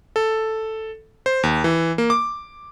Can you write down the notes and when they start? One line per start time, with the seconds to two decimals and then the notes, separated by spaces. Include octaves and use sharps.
0.16 A4
1.26 C5
1.43 D#2
1.64 E3
1.98 A#3
2.10 D6